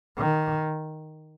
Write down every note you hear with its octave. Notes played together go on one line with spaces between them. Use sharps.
D#3